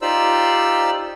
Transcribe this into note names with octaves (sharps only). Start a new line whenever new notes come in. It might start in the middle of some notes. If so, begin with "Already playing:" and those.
D#4 F4 G4 C5 D5 E6